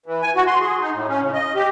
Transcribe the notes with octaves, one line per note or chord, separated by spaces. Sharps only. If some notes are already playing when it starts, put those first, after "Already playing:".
E3
G#5
F#4
C6
G#4
D#4
A2
C#4
C#3
D#5
G4